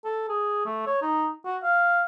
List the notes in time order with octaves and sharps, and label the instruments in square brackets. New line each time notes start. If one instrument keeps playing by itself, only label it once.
[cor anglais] A4
G#4
A3
C#5
D#4
F#4
F5